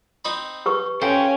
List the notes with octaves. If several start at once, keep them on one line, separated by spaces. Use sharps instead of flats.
C4 D#4 B5
G4 B4 C#6
C#4 A4 C5 F5 G5